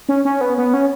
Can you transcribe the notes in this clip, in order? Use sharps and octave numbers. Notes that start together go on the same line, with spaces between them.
C#4
C#4
B3
B3
C#4